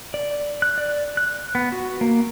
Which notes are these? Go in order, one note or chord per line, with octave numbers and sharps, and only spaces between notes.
D5
F#6
D5
F#6
B3
F#4
A#3